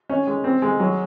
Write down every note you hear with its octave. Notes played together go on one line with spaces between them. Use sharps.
C#4
G#3
C4
G#3
F#3